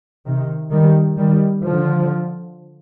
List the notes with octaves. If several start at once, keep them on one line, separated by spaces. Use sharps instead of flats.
C3 D#3
D#3 G3
D#3 G3
D3 F3